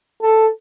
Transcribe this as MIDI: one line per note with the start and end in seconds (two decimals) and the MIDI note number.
0.22 0.47 69